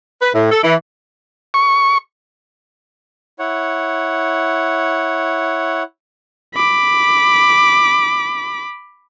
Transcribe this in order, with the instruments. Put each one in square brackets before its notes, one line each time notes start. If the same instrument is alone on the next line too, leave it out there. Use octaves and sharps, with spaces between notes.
[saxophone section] B4
A2
A4
E3
[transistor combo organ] C#6
[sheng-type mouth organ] E4 C#5 F#5
[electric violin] B5 D6